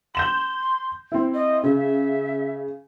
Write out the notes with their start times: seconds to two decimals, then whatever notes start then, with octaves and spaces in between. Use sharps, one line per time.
0.15 C6 G6 E7 F#7
1.12 C4 E4
1.34 D#5
1.64 C#3 E5